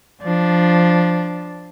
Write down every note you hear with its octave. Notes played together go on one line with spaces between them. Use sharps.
F3 D4